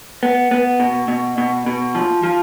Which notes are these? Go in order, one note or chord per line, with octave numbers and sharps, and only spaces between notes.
B3
B3
B2
B2
B2
B2
F3
F3